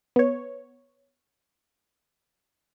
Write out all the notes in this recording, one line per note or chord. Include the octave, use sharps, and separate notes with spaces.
B3 C#5